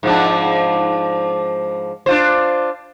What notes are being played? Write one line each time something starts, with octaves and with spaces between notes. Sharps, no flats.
G#2 F3 D4
D4 F4 C5